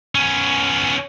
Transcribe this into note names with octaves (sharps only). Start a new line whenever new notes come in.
B3 C#4